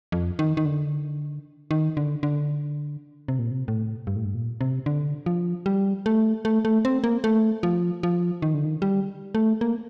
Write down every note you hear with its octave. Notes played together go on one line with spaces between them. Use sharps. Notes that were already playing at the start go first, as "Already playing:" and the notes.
F2
D#3
D#3
D3
D#3
D3
D3
C3
A#2
C3
A2
G2
A2
G2
A#2
C3
D3
F3
G3
A3
A3
A3
C4
A#3
A3
F3
F3
D#3
D3
D#3
G3
A3
A#3